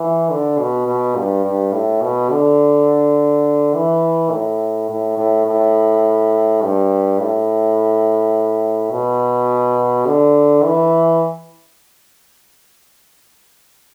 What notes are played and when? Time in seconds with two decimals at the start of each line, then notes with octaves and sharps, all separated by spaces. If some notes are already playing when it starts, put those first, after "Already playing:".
Already playing: E3
0.30 D3
0.58 B2
0.87 B2
1.16 G2
1.44 G2
1.73 A2
2.02 B2
2.31 D3
3.75 E3
4.31 A2
4.89 A2
5.18 A2
5.46 A2
6.62 G2
7.20 A2
8.91 B2
10.06 D3
10.64 E3